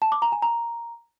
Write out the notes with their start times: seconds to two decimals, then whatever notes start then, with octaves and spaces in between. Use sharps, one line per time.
0.02 A5
0.12 D6
0.22 A#5
0.32 G#5
0.42 A#5